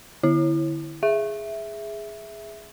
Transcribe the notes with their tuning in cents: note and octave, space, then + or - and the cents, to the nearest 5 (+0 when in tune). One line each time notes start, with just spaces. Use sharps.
D3 +15 E4 +0
G#4 +0 E5 +0